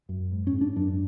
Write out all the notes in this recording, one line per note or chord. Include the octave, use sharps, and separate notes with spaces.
F#2
G#2
C#4
G#2
D4
F#2 D4